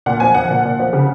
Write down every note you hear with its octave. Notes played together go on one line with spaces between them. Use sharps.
A#2 F#5
F3 G#5
F3 F#5
A#2
A#2
F3
C#3